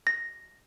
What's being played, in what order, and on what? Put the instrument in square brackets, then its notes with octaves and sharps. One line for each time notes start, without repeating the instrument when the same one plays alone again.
[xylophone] A#6